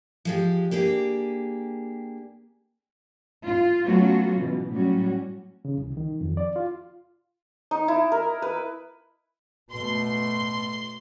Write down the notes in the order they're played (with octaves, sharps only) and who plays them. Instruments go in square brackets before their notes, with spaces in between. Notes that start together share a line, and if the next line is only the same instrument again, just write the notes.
[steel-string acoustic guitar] F3 G#3 G4
A#3 D4 G4 G#4
[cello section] F4
F#3 A3 B3 C#4 F4 F#4
B2 E3
A2 F#3 G3 C#4 F#4
[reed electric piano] C#3
C2
D#3
F2
D5
F4
[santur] D#4
E4
A#4
B4
[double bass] B2 A3 [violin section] C6